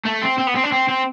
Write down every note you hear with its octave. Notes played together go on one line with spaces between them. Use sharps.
A3
C4
C4
B3
C4
D4
C4
C4